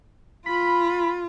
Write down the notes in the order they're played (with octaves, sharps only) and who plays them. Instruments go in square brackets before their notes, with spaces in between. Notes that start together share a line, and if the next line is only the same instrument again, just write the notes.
[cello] F4 [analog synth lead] B5